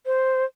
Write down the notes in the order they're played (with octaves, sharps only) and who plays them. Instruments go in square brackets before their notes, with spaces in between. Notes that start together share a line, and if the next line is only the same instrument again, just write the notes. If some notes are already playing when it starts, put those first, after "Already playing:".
[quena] C5